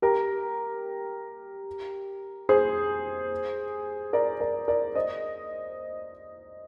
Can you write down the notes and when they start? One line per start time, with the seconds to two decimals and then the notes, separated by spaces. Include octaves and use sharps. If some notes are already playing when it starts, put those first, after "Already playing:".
0.02 G4 A#4
2.49 G#4 C5
4.13 A#4 D5
4.40 A#4 D5
4.68 A#4 D5
4.95 C5 D#5